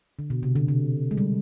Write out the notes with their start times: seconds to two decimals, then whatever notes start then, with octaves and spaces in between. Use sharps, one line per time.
0.19 D3
0.30 B2
0.43 C3
0.56 D3
0.68 C3
1.11 G#3
1.17 G3